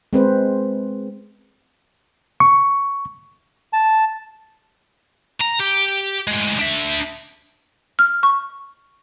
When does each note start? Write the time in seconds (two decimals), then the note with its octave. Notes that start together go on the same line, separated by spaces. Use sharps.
0.13 G#3 C4 B4 C5
2.40 C#6
3.73 A5
5.41 A#5
5.60 G4
6.28 A2 G#3
6.59 D4 E5
7.99 F6
8.23 C#6